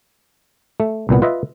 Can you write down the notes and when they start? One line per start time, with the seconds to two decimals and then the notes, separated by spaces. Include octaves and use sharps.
0.80 A3
1.09 C2 A#2 B3
1.22 F4 B4 D#5 E5